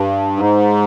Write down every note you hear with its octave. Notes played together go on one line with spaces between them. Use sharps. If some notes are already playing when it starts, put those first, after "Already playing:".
Already playing: G2
G#2